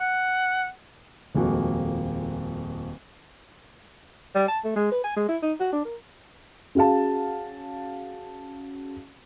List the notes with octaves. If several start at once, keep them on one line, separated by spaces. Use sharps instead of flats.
F#5
D#1 F2 G#3 A#3 F#4
G3
A5
A3
G#3
B4
G#5
G#3
E4
D#4
F#4
D4
A#4
C#4 F#4 G#4 F5 A5